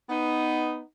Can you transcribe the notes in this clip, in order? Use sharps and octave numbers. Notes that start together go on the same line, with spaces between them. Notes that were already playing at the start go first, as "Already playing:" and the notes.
B3 D#4